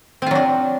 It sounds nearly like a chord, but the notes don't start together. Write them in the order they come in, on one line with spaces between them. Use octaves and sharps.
C4 F4 F#3 D4